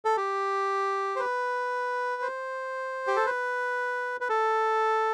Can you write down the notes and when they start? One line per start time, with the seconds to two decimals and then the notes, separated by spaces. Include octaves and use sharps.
0.05 A4
0.17 G4
1.16 C5
1.19 B4
2.22 C5
3.07 G4
3.16 A4
3.26 B4
4.21 B4
4.29 A4